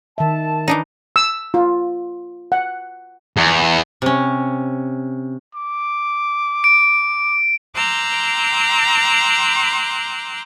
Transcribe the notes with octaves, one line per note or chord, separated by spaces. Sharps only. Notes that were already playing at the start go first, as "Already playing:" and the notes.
D#3 E5 A5
E3 D4 D#4
E6
F4
F#5
E2
C3 C#4
D6
D7
G5 A#5 C6 D6 E6 F#6